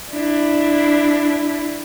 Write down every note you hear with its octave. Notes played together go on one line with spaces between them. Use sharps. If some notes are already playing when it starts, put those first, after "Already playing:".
D4 E4